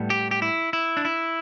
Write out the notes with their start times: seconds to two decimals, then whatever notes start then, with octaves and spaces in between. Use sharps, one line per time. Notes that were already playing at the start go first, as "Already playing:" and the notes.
Already playing: A2 G3 B3
0.10 G4
0.31 G4
0.42 E4
0.73 E4
0.97 D4
1.05 E4